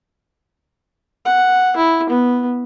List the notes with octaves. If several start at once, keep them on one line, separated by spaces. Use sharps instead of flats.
F#5
E4
B3